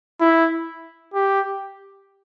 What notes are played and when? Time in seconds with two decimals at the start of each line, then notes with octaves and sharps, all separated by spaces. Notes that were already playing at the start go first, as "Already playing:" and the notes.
0.21 E4
1.14 G4